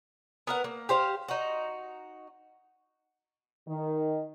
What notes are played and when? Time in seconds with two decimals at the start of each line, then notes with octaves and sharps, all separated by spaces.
0.47 B3 A#4 F#5
0.64 A#3
0.89 G4 C5 F5
1.28 D#4 F#4
3.68 D#3